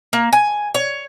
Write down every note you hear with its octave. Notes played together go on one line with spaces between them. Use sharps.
A#3
G#5
C#5